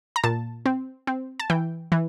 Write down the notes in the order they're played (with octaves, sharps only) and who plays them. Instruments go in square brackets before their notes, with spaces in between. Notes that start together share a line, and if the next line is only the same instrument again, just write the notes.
[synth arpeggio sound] A#5
A#2 A5
C4
C4
A5
E3 G5
E3